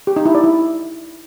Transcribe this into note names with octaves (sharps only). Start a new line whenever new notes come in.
G4
D#4
E4
D5
E4